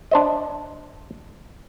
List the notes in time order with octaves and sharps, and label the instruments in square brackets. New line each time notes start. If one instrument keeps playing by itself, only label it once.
[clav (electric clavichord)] D4 C5 D#5